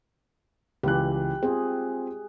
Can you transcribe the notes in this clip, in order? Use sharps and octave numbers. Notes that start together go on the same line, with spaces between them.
C#2 E3 G4 F#6
C4 F4 G#4